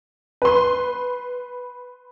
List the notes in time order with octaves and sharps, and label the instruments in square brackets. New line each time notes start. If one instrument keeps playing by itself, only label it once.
[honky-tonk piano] B4 C6